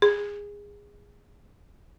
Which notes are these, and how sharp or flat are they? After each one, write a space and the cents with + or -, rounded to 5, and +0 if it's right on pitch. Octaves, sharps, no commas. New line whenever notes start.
G#4 -20